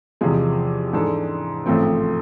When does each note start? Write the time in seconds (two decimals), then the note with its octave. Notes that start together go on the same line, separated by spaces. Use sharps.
0.21 E2 C3 F3 G#3
0.93 G#2 E3 G#3 D4 A4
1.66 A1 G#2 F3 A3 C4